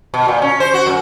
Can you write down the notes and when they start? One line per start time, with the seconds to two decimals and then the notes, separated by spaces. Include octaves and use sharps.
0.14 B2
0.28 A#2
0.42 C#4
0.60 C5
0.74 F#4
0.86 F#2